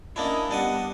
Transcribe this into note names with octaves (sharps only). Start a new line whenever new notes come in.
A#3 C#4 D4 E4 D#5
G3 B3 D4 D#5 F#5